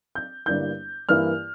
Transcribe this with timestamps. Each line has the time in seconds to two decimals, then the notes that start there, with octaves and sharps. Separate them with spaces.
0.15 G6
0.46 G1 G2 G3 A#3 E4 G6
1.09 G2 E3 A#3 E4 F6